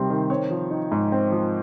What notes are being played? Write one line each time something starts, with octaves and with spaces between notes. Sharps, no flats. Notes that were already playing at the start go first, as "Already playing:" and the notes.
Already playing: C3 D#3 G3 C4 C6
D#3
C4 C#5
F3
D#4
G#2
C4
F3